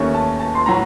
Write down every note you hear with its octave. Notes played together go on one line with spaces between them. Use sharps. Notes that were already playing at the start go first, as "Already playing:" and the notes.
Already playing: D#2 D#3 A3 C#4 C#6
A5
A5
C6
A2 F#3 A#5